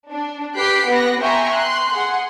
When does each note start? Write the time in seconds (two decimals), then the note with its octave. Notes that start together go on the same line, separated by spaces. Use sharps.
0.11 D4
0.56 G4 B4 F#6 B6 C7 D7
0.88 B3 F#6 A#6
1.21 E5 G5 G#5 A#5 C6 C#6
1.53 C6 F#6
1.93 G#4 F#5 C6